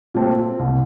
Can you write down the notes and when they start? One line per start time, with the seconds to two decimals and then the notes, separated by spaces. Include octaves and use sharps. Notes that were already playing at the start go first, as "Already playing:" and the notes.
0.14 A#2 A3 C4
0.59 C2